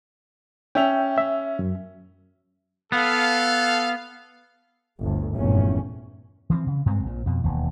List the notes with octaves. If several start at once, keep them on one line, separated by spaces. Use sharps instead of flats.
C#4 E5 G5 F7
E5
F#2
B3 A4 F5
G1 D2
F1 E2 G2 A#2 C#4
E3 F3 A#3 C4
C#3
G2 G#3 C4
A#1 A#2
F2 B2
E1 D#2